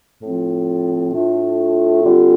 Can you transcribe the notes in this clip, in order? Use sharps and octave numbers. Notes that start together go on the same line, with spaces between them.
A2 F3 C4 F4
A2 A3 D4 F4
D3 G3 C4 F4